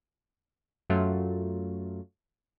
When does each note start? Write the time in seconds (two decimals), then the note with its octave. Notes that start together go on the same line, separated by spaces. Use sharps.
0.90 F#2 F#3 A3 F4